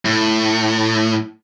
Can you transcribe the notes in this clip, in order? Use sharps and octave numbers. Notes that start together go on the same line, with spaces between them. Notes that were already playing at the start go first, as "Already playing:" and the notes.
A2